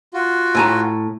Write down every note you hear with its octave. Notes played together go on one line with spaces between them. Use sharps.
F4 F#4
A2 G#5 A#5